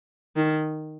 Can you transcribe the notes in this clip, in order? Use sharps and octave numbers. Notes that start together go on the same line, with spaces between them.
D#3